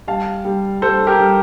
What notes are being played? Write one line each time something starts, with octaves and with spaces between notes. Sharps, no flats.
G3 F5 A5
G3
G3 A4 C5
G4 A#4
G3